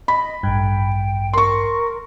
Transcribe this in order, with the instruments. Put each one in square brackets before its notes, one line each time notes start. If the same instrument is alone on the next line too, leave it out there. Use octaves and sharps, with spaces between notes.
[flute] D#5 [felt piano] B5
[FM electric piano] A1 G2 [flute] G5
[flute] A#4 [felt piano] C6 C#6